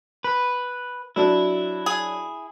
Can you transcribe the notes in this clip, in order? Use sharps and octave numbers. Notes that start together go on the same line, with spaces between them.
B4
F#3 D4 E4
G#4